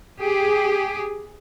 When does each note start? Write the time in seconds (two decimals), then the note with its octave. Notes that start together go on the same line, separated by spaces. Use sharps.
0.20 G4 G#4